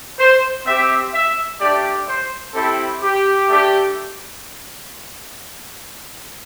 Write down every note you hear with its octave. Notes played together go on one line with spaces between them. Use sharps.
C5
C4 G4 E5
E5
A3 D4 G4 D5
C5
C4 E4 G4 A4
G4
A3 D4 G4